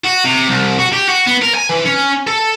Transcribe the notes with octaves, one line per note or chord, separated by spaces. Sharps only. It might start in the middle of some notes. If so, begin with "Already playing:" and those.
F#4
C3
C2
F#4
G4
F#4
B3
A#4
G#5
E3
C#4
A4